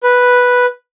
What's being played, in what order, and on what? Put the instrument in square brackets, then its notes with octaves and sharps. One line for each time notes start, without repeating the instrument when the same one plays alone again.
[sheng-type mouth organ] B4